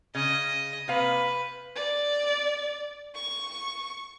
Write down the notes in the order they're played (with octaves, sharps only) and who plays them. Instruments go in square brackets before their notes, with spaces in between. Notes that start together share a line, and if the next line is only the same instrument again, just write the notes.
[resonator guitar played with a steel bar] C#3 [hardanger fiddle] D#5
[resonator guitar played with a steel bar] C3 A#3 F5 [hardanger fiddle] B4
[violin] D5
C#6